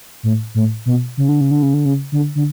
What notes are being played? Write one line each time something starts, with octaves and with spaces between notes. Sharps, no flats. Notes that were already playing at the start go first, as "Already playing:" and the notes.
A2
A2
B2
C#3
D3
C#3
D3
C#3
D3
C#3
D3
D3